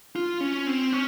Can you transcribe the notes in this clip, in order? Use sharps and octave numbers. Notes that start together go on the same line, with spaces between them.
F4
C#4
C4
C#4